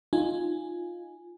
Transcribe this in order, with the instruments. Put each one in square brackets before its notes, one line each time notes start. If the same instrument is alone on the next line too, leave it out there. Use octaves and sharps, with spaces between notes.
[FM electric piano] D#4 F4 G#5